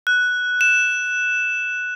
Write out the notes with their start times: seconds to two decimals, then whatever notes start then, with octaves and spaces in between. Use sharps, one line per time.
0.07 F#6
0.61 E7